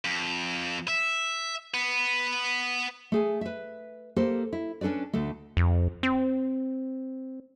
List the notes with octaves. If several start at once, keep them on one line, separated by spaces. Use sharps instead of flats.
F2
E5
B3
A3 G#4 G#5
B4 E5
A#3 G4 A4 C5
E4
C#4 D4 A4 B4 D5
D2 D3 A3
F2
C4